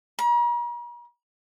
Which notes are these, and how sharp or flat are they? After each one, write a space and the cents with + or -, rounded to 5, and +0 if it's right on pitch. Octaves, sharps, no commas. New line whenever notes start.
A#5 +45